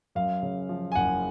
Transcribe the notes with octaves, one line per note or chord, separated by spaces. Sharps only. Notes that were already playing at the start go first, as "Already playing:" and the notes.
F#2 F5
C#3
F3
G#5
F#1 F#5